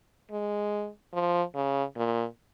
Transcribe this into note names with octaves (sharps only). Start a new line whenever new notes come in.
G#3
F3
C#3
A#2